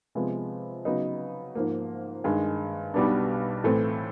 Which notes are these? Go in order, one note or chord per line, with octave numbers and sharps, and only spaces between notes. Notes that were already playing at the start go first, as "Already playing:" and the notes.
C3 F3 G#3 B3
C#3 F#3 B3 D#4
G#2 F3 A#3
G2 D#3 G#3
B1 B2 G3 B3 D4
A2 E3 A3 C4